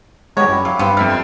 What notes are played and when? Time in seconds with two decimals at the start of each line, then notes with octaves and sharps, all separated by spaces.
0.37 G#3 B3 D4 G4 C#5 A#5
0.49 F#2 E4 G4
0.65 F#3 F5
0.79 G2 B3 C4 B4
0.97 F2 G3 E5 F6
1.09 G5 A5 C6